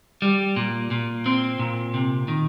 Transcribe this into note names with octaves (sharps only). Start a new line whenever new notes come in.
G3
A#2
A#2
C4
A#2
C3
D#3